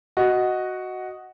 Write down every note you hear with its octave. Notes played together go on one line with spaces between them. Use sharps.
F#4 D#5